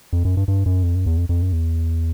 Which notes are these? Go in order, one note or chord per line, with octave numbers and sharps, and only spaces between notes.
F2
F#2
G2
G2
F#2
F2
F#2
E2
F2
F2
F#2
E2